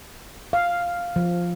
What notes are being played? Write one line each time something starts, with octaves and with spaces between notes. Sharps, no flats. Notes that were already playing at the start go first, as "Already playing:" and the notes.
F5
F3